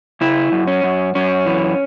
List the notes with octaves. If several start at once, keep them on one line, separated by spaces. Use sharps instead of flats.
C#3 E4
F#2
C#4
F#2
F#2 C#4
E3